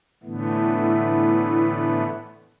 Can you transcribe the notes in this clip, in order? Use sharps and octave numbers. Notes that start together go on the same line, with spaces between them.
A2 D3 E3 A3 B3